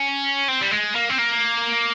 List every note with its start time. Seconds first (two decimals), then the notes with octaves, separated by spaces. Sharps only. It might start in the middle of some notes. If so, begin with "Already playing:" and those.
Already playing: C#4
0.48 C4
0.62 G3
0.72 G#3
0.95 A#3
1.10 C4
1.18 A#3